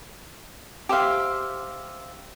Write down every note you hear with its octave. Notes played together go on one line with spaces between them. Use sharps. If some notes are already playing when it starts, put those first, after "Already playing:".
G4 C5 E5 F5